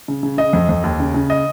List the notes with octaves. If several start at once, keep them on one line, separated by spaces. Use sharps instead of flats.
C#3
C#3
C#3 D#5
F2
F2
D#2
C#3
C#3
D#5